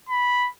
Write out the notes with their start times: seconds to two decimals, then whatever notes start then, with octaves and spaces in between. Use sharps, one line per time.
0.09 B5